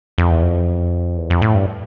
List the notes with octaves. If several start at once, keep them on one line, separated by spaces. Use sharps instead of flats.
F2
E2
F2
E2
F2
A2
G2